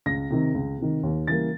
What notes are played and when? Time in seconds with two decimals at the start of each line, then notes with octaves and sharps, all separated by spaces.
0.06 C#2 A#6
0.30 C3 D#3
0.54 C#2
0.78 C3 D#3
1.03 D#2
1.27 C#3 E3 G3 A#3 A6